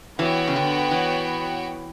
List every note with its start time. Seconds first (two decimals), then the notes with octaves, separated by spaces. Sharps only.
0.19 E3 B3 F#4 C#5 G5
0.48 C#3
0.56 D3
0.91 E3